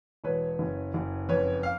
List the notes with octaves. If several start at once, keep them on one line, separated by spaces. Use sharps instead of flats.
E1 B4 C#5
F#1
F#1
F2 B4 C#5
F5